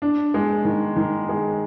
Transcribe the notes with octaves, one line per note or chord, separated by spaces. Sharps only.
D4
G#3
D#3
D#3
G#3